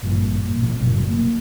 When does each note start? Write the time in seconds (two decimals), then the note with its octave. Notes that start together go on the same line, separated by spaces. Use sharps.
0.03 G#1 G2 A#2 F3
0.45 A#2
0.62 B2 F3
0.79 F#1 C2 A2 F#3
1.06 A#3